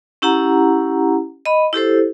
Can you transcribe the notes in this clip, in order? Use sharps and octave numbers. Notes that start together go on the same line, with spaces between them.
C#4 E4 G4 F#5 A#5
D#5 B5
E4 G4 A4 C5